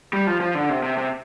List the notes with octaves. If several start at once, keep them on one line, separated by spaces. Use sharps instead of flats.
G3
F3
F3
D3
C3
C3
C3